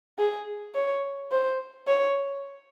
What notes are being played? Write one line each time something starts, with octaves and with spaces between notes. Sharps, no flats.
G#4
C#5
C5
C#5